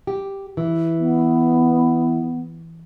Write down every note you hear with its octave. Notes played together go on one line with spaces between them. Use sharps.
G4
E3
B3